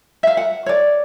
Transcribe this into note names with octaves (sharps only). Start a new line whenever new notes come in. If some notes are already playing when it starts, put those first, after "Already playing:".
E5 F5
F#5
C#5 D5